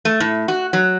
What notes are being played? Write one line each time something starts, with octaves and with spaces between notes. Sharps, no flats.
A3
A2
F#4
F#3